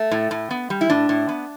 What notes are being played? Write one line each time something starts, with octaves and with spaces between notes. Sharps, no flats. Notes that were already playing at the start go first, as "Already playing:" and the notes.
Already playing: A3
A2
A2
B3
G3
E4
A2 D4
A2
B3